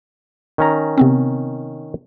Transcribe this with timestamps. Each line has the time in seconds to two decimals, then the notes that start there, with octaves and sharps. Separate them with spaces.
0.58 D#3 C#4 A#5
0.98 C3 B3 C4